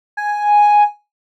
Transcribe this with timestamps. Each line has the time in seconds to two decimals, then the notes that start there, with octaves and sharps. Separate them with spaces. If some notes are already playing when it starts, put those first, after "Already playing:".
0.17 G#5